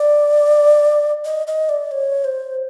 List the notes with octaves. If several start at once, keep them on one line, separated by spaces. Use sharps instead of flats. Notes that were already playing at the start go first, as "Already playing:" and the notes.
Already playing: D5
D#5
D#5
D5
C#5
C5